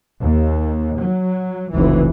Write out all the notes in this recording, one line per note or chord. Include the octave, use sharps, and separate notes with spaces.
D#2
F#3
F1 C#2 E3